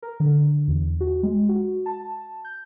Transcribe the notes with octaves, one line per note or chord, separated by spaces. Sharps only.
A#4
D3
E2
F#4
G#3
F#4
A5
G6